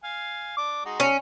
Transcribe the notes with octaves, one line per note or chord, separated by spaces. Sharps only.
F5 G#5
D4 D6
G#3 D#4 F#4
C#4